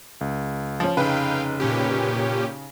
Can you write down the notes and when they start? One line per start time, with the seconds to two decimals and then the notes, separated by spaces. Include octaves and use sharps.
0.21 C#2
0.80 F3 C#4
0.97 F1 C#3 D#4 B4 F5 G5
1.60 A#2 C#4 G4